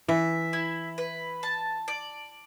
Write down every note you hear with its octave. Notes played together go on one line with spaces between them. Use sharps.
E3 E5
E4
B4
A5
D5